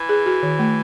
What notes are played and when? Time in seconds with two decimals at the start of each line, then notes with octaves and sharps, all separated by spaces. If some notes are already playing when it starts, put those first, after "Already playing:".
Already playing: E3
0.09 G#4
0.26 F#4
0.43 D#3
0.59 A3